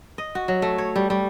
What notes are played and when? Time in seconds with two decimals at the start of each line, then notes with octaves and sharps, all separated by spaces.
0.18 D#5
0.35 F#4
0.48 F#3
0.62 A3
0.78 C#5
0.96 G3
1.10 G3